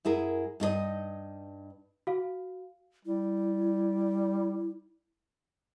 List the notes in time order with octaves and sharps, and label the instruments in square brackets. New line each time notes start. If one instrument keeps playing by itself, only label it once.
[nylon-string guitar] F#2 E4 G#4 A#4
G2 D#4 A4 D#5
[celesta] F#4 F5
[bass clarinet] G3 [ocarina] E4